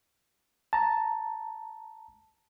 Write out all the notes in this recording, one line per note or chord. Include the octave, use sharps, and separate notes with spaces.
A5 A#5